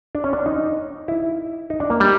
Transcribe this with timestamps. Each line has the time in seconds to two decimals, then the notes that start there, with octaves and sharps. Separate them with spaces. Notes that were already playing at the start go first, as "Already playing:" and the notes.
0.15 D4
0.24 C#4
0.33 D4
0.46 D#4
1.08 E4
1.70 D#4
1.80 D4
1.90 A#3
2.00 G3